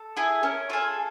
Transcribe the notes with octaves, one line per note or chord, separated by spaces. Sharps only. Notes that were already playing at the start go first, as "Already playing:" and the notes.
Already playing: A4
E4 G#4
C#4 A#4
F4 G#4 A4